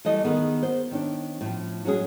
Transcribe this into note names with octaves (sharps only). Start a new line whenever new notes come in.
E3 G3 A3 D#5
D#3 B3 G#4
C5
D#3 C#4 D4
A2 F3
F#3 G#3 C#4 G#4